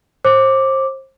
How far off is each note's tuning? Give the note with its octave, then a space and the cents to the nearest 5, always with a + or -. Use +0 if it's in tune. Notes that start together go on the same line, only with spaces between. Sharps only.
C5 +30 D6 +0